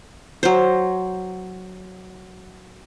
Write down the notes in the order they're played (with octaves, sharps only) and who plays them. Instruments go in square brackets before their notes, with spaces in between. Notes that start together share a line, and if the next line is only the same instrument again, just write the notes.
[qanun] F#3 C5